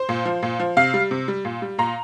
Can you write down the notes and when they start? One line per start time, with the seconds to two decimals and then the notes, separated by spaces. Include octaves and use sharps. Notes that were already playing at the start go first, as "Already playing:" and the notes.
Already playing: C5
0.09 A#2
0.25 F3
0.43 A#2
0.60 F3
0.77 C3 F5
0.94 G3
1.11 C3
1.28 G3
1.45 A#2
1.62 G3
1.78 A#2 A#5